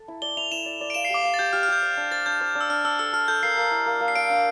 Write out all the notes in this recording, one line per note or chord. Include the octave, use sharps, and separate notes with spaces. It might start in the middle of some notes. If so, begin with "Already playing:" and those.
Already playing: A4
E4
D5 G7
E4 F7
E4 E7
D5
D5
D7
F5 E7
C7
G4 D6
F5
A6
G4 G6
G4 F6
F6
G4 G6
C5
D4
C5 A6
D4 G6
C5
D4
E6
D4 F6
D4 E6
A4 E6
A4 F6
A4 G6
A#3 C7
A#3
E4
A#3
A#3
C7
F5 D7
D4